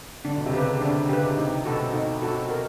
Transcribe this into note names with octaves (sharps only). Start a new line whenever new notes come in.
D3 D4
B2
C3
C#3 G4 B4
D3 D4
C#3 G4 B4
C3 D#4
B2 F#4 A4
D#4
F#4 A4
A#4